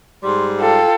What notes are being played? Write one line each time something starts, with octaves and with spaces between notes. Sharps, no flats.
G#2 G3 C6
F4 A4 G5